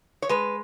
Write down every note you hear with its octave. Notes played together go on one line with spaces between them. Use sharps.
C#5
G#3 B4